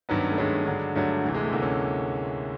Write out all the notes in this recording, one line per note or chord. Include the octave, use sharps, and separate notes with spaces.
G2 D#3 F#3 B3
C#4
A3
G2 D#3 F#3 G#3
G2 D3 F#3
G2 D3 F#3 A3
D2 C3 E3
G#3
A3
D2 C3 E3 A#3
C#4